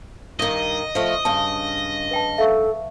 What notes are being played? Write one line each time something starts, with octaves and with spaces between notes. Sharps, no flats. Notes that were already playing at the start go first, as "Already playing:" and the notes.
G2 D#3 D#5
F3 A3
G2 C#3 A5
B4 G5 A5
A4 E5 F5 C#6